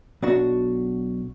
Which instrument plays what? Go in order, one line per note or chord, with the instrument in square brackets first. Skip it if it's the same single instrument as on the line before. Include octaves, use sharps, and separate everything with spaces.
[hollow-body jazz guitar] B1 D4 F#4